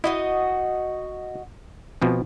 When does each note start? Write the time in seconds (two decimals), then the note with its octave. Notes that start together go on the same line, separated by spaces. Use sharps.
0.04 D#4 E4 F#4 D#5
2.02 B2 F3 C4